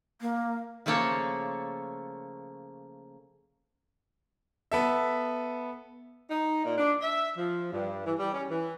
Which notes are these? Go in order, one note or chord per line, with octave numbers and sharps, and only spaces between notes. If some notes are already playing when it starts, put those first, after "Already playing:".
A#3
C#3 F3 A3 A#3 A4 C#5
B3 A4 E5
D#4
A#2
D4
E5
F3
G2
E3
G3
C#4
E3